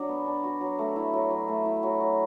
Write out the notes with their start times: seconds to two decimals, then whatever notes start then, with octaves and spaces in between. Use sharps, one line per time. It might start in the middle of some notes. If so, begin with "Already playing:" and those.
Already playing: F#3 D4 F#4
0.09 B3
0.26 D4
0.44 F#4
0.61 F#3
0.79 A3
0.96 E4
1.13 F#3
1.31 F#3
1.48 A3
1.65 E4
1.83 F#3
2.01 F#3